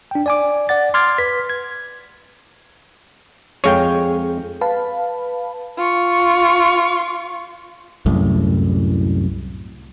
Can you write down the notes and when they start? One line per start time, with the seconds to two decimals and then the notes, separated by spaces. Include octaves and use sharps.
0.11 D4 G5
0.26 D5 G#5 D6
0.69 D5 F#5 A6
0.94 C6 D6 F6 G#6 A6
1.18 B4 B6
1.50 G#6
3.64 F2 G#3 C#5 F5 G5
4.61 B4 F5 A5 B5
5.78 F4 C#6
8.06 C2 F#2 A2